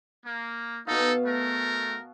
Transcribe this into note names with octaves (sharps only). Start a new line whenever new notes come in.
A#3
B2 D#4 A4 F5
A3 A#4